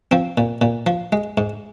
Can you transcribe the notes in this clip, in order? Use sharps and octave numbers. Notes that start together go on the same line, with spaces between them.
F3 C4
A#2
A#2
F3
G#3
G#2